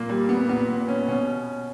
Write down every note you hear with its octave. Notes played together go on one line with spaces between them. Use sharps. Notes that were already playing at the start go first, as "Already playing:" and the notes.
Already playing: A#2 A#3
G3
B3
A#2 B3
B3
C#4
B2 C#4